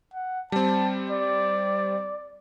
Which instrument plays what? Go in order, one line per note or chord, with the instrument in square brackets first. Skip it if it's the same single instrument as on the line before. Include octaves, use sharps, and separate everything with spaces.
[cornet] F#5
[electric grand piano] G3 C4 [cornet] A5
[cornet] D5